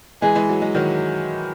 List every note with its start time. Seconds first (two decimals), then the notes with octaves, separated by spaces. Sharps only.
0.21 E3 G#3 G#4
0.35 E3 G#3
0.49 F#3
0.62 G#3
0.75 D#3 F#3